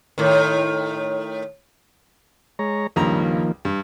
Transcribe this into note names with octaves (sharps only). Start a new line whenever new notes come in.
A2 D#3
G#3 C#5 A#5
C#2 G2 D#3 F3 A#3 A#5
G2